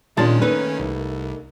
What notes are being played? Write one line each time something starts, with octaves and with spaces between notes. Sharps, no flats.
A#2 D#3 G#3 C#4 D4 F4 A5
A3 A#3 D#4 B4
C2